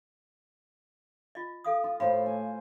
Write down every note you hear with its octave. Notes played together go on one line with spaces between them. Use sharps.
F4 D#5
A4 F5 D#6
F4
A2 C5 F5 B5
G#5